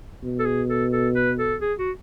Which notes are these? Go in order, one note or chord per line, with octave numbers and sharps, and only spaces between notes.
B2
A4
G#4
A4
A4
B4
A4
G#4
F#4